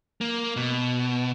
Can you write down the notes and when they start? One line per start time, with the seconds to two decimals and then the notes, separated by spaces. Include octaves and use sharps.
0.21 A#3
0.56 B2